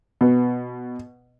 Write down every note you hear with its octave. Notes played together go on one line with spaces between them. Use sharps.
B2 B3